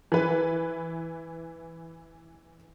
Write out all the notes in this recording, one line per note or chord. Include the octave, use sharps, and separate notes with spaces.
E3 B4